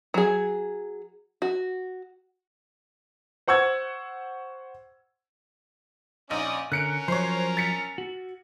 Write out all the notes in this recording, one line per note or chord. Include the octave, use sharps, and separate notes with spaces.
F#3 G#4
F#4
C5 F#5 C#6 E6 G#6
A#1 C#4 D#4 D5 D#6
D3 C#4 A#4 F#6 C#7 D7
F3 F#3 C5 C#5
A6 B6 C#7
F#4